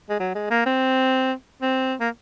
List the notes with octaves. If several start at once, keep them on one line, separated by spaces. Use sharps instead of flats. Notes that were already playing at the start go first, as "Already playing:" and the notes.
G#3
F#3
G#3
A#3
C4
C4
A#3